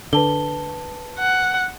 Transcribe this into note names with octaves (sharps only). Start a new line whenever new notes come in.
D3 B4 A5 G7
F#5